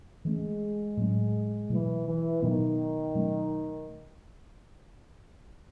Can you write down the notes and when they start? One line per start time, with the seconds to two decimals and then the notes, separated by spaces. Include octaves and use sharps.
0.24 E3 G#3 A3 C#4
0.97 A2 F#3 A3 C#4
1.70 B2 E3 F#3 A3
2.06 E3
2.42 B2 D#3 F#3 B3
3.15 B2 F#3 A3 C#4